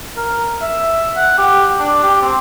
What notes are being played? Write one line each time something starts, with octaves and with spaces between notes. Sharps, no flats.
A#4
E5
F#5
G4
D4
G4
C4